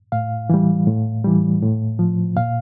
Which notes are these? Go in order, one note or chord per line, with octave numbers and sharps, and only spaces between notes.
A2 F5
E3 G3
A2
E3 G3
A2
F3
A#2 F5